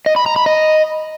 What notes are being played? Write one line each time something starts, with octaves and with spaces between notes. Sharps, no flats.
D#5
B5
A#5
B5
D#5